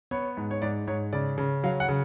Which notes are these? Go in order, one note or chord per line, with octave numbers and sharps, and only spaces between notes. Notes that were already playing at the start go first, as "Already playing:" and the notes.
B3 C#5
G#2
C#5
G#2 D5
G#2 C#5
C#3 D5
C#3
F#3 F5
F#5
C#3